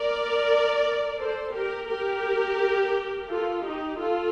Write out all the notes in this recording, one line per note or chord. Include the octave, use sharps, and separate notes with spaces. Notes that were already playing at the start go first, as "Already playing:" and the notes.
Already playing: A#4 D5
A4 C5
G4 A#4
G4 A#4
F4 A4
D#4 G4
F4 A4